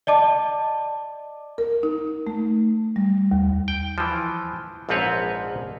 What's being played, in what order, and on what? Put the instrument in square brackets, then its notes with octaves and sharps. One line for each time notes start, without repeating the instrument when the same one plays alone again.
[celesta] D5 D#5 A5 D6
[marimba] A#4
D#4
A3
G3
D#2
[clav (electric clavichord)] G5
E3 F3
A#1 G#2 F3 C4 B4 C#5